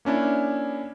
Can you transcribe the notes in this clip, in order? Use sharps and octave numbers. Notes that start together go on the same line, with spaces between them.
A#3 C#4 D4 E4